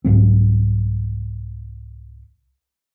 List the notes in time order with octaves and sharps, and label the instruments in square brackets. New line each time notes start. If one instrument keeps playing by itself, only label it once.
[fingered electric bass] C2 G#2 F#3 C4